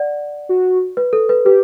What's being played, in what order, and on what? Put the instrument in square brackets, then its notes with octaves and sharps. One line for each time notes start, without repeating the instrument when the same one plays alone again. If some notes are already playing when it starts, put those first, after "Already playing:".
Already playing: [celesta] D5 F#5
[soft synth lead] F#4
[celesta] B4
A4
B4
[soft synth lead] G4 [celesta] B4